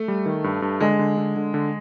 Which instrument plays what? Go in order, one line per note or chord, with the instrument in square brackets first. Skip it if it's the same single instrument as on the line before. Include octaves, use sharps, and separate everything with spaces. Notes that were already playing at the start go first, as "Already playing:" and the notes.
Already playing: [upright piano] A3
[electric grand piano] G3
D#3
G2
G2
[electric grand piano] D3 [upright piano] G#3
[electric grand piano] D3
D3
D3
D3